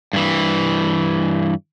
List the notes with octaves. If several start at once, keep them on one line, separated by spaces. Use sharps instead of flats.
G2 E3